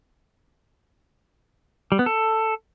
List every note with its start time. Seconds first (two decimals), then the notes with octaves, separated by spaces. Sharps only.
1.92 G3
1.99 B3
2.06 A4